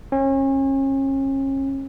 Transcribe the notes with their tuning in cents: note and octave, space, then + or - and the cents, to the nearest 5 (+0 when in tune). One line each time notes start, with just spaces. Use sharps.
C#4 -35